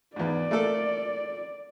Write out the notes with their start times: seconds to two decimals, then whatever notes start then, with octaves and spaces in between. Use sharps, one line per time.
0.16 E2 G#2 D5
0.51 A3 A#3 A4